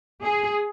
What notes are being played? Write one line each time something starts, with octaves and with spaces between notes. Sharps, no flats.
G#4